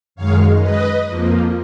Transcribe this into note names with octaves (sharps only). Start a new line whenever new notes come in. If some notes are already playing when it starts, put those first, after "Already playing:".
F#2 D#3 G#3 C#5 F5
B4 D#5
F2 F3 A#3